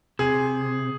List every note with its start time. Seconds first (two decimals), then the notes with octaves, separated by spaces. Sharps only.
0.19 C3 G#4